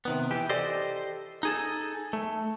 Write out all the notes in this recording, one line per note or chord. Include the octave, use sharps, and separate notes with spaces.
C3 D#3 B3
E3 G4
G4 A4 C5 D5 D#5
D#4 G#4 A4
A3